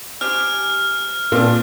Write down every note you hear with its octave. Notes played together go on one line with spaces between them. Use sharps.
G4 C5 G#5 F6
A#2 C4 D4 A#4 B4